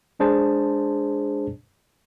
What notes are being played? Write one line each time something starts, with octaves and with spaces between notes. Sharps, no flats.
G#3 D4 G#4 C5 A5